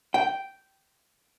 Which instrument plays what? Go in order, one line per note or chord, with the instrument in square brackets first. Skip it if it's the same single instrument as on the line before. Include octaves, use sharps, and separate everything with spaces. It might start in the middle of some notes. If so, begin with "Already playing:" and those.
[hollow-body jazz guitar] G5